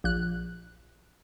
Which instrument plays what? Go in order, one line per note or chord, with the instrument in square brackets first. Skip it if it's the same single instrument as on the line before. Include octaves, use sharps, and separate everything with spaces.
[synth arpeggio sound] A#1 F#6